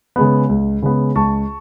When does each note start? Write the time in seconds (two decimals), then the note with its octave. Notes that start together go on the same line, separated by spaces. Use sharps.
0.16 C#3 G#3 B3
0.49 C#2
0.82 C#3 G#3 B3
1.15 C#2 A5 C#6